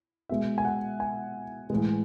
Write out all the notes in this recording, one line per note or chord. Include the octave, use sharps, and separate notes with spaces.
B2 G#3 E5
G#5
F#5
G#5
A2 E3 G#3